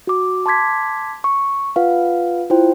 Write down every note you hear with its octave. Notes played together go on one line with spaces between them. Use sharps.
F#4 D6
A5 C6 D6 G#6 B6
C#6
F4 B4 F5 F#5
E4 F4 C5 G5